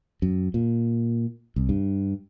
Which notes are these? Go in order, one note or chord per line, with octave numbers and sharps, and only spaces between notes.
F#2
A#2
C2
G2